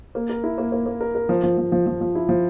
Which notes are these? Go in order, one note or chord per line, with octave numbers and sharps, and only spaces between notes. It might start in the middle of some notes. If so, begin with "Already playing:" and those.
A#3
A#4
E4
A#3
A#3
A#3
A#4
A#4
F3
F3
F3
F3
F3
F3
E4
F3